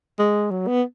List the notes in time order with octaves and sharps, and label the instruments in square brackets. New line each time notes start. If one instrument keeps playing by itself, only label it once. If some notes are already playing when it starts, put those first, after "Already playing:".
[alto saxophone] G#3
F#3
B3